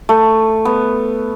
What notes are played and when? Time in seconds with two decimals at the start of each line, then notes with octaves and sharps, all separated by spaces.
0.09 A3
0.65 B3